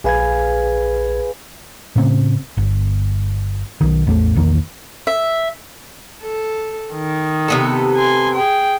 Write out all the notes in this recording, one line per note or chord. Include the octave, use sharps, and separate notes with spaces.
A#1 G#4 B4 F5 G#5 G#6
A2 C#3 C4
G1
B1 D#3
A1 E2 G#3 A3
A#1 E2 D#3 A#3
E5
A4
D#3
C3 B3 A4
G#5 C6
G#4 G5